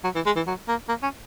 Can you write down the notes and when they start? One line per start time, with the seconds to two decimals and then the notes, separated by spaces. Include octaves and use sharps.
0.04 F#3
0.15 E3
0.26 G#3
0.36 E3
0.47 F#3
0.68 A#3
0.89 A#3
1.03 C#4